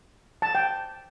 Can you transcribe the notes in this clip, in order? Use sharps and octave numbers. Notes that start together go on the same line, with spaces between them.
A5
G5